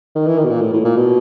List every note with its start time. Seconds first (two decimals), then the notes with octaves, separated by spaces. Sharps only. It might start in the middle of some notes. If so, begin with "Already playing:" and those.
0.15 D#3
0.27 E3
0.39 D#3
0.45 B2
0.50 A#2
0.61 A2
0.73 A2
0.85 A#2
0.97 B2